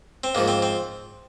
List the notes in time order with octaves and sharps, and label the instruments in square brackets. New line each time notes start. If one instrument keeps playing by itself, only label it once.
[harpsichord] C4
G#2 F3 A#3
C4
C4